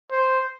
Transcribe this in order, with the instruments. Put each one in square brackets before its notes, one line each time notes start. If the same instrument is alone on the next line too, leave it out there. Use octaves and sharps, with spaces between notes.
[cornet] C5